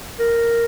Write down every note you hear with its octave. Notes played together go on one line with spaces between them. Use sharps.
A#4